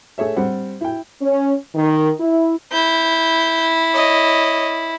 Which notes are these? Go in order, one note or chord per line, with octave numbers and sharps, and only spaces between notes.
A3 G#4 C#5 E5
G3 C4 C5 F#5
E4 G5
C#4
D#3
E4
E4 G6
C#5 D#5